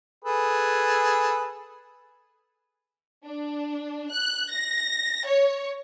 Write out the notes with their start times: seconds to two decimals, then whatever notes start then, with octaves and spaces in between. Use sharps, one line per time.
0.24 G#4 A4 B4
3.24 D4
4.11 F#6
4.50 A#6
5.26 C#5